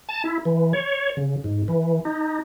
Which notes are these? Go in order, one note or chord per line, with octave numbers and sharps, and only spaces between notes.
A5
E4
E3
C#5
C#3
G#2
E3
D#4